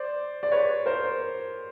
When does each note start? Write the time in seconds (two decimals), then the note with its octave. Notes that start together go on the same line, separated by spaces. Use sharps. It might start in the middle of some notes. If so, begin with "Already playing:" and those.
Already playing: C5 D5
0.43 D5
0.52 B4 C#5
0.86 A#4 C5